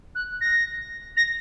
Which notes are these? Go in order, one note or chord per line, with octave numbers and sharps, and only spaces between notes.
F#6
A#6
A#6